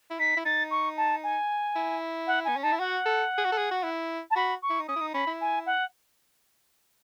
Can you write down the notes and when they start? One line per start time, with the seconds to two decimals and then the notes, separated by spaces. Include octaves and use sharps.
0.10 E4
0.19 D#4 B6
0.37 E4
0.45 D#4 A6
0.71 C#6
0.97 A5
1.23 G#5
1.76 E4
2.27 F#5
2.45 B3 G#5
2.56 C#4
2.62 D#4 A5
2.72 E4
2.80 F#4 F#5
3.06 A4
3.38 G#4
3.45 F#4
3.52 A4
3.58 G#4
3.71 F#4
3.84 E4
4.31 A5
4.36 F#4 B5
4.62 C#6
4.70 E4
4.79 D#4
4.88 C#4 D#6
4.96 E4
5.01 D#4
5.14 C#4 B5
5.27 E4
5.41 G#5
5.66 F#5